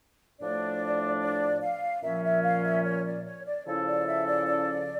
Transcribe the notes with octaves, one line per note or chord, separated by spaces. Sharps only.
A2 F3 A3 D4 D5
D5
F5
A#2 F3 C#4 E5
E5
F5
E5
C#5
D5
C#5
D5
C#3 F3 C#4 E4 A4 C#5
D5
E5
D5
D5